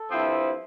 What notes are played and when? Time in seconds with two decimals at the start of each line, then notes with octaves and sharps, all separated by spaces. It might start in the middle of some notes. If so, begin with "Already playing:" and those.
Already playing: A4
0.11 G2 F3 C4 E4